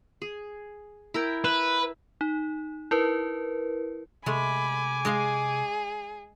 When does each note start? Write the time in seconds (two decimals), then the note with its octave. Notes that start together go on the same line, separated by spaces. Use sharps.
0.22 G#4
1.14 E4 A#4 G5
1.44 B4 E5
2.21 D#4
2.91 E4 A#4 B4
4.26 C3 G#3 A3 G#5 B5 D6
5.05 G#3 G#4 D#5 F5